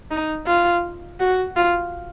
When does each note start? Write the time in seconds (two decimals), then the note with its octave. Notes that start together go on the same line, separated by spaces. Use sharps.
0.11 D#4
0.46 F4
1.20 F#4
1.56 F4